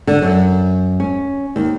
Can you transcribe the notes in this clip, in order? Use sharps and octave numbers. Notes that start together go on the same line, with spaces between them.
D3
F#2
C#4
D#2